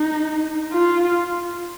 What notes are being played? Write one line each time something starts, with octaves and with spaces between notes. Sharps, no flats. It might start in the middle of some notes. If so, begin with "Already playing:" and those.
Already playing: D#4
F4